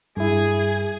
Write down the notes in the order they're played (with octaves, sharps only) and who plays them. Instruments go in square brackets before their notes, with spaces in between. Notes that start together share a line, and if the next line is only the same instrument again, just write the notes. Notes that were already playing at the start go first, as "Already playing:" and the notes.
[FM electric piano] G2 E4 [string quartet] G#4